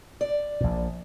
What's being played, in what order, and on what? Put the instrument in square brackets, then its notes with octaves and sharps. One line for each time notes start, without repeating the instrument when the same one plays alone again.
[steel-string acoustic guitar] D5
[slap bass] A#1 A#2